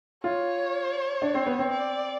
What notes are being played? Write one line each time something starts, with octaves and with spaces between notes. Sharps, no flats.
F4 C#5
D4
C4
B3
C4
D5